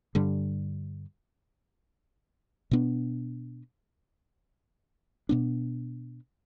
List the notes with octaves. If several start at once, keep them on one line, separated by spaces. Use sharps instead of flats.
G2 D3 G3
B2 B3 D4
B2 B3 D4